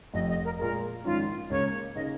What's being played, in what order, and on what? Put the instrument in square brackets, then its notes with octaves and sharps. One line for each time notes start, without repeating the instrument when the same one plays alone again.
[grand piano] F1 F2 F3 [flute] D#5
[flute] D#5
A#4
[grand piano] A#2 G#3 F4 G#4 [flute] A#4
[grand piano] A#1 G#2 D#3 C#4 [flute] F4
[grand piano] C#2 C#3 A#3 [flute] C#5
[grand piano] C#3 A#3 D#4 G#4 [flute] D#5